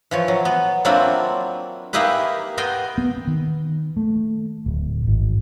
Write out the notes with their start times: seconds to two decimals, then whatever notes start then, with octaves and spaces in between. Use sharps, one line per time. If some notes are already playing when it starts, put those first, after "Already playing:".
0.11 E3 F3 C#5
0.28 F#3
0.45 B3
0.85 F#3 A#3 C4 D4 E4 F4
1.93 A#3 D#4 E4 G4 G#4 B4
2.57 B3 A#4 D#5 G5 C6
2.98 B3
3.27 D#3
3.97 A3
4.66 D1
5.07 G#1